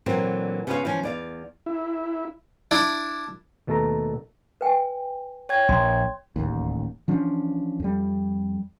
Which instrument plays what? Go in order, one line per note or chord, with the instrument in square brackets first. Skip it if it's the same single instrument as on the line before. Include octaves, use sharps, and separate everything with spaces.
[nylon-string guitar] A#2 D3 E3 F#3 A#3 C4
C#3 B3 C#4 F4 C#5 F5
E3 F3 C#4
E2 D5 F5
[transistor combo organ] E4
[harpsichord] D4 E4
[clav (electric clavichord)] D#2 B2 A3 A4 E5 A#5
[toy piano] B4 G5 G#5
[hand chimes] C#5 G5 G#6
[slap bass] A#1 [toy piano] C6
[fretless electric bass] D1 A1 D#2
E3 F3 C#4 D4
F2 G3